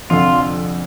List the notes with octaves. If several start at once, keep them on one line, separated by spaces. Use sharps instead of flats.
F1 F2 D3 F4